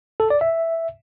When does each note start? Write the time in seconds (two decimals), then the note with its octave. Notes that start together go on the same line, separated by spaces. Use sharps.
0.20 A4
0.30 D5
0.41 E5